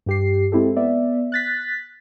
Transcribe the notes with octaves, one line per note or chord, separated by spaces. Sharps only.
G2 G4 C7
G#3 C4 E4 G4 A4
B3 D5 E5
F#6 A6 B6